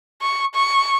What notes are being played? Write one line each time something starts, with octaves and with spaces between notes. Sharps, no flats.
C#6
C#6